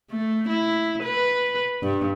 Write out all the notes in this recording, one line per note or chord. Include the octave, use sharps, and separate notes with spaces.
A3
E4
B4
G2